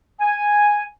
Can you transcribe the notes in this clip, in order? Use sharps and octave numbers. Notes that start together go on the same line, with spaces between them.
G#5